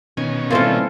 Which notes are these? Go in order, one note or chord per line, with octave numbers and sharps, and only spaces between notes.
B2 D#3 C#4 G#5
E3 G3 A#3 C4 F4 A4 C5